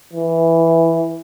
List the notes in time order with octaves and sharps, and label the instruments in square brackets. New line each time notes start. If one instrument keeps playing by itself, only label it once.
[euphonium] E3